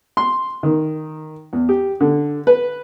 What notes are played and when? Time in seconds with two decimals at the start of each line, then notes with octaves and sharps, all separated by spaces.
0.17 C6
0.63 D#3
1.53 E2
1.69 G4
2.01 D3
2.47 B4